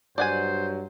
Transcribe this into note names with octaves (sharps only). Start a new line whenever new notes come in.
G2 F#3 C5 D5 F#5 G#5